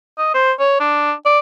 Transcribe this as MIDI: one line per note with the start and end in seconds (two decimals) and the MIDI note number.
0.18 0.33 75
0.34 0.52 72
0.59 0.77 73
0.80 1.12 62
1.26 1.39 74